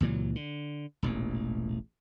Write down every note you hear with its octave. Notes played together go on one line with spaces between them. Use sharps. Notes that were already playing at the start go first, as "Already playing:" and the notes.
C#2 A#2 E3 F#3
D3
E1 A1 A#2